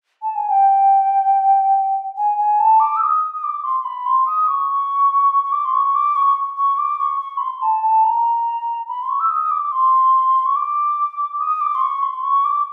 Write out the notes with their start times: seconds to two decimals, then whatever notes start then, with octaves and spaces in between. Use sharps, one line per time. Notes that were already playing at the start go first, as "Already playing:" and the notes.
0.22 A5
0.35 G#5
0.49 G5
2.17 G#5
2.38 G#5
2.59 A5
2.79 D6
2.96 E6
3.01 D#6
3.34 D#6
3.43 D6
3.64 C6
3.80 C6
3.84 B5
4.05 C6
4.26 D#6
4.48 C#6
5.43 C#6
5.52 D6
5.64 C6
5.73 C#6
5.94 D6
6.16 C#6
6.57 C#6
6.78 D6
6.99 C#6
7.20 C#6
7.37 B5
7.41 C6
7.62 A5
7.83 A5
8.04 A#5
8.88 B5
9.03 C6
9.09 C#6
9.20 E6
9.30 D#6
9.51 D6
9.72 C6
10.46 C#6
10.56 D6
11.39 D#6
11.60 D6
11.75 C6
11.81 C#6
12.02 C6
12.23 C#6
12.44 D6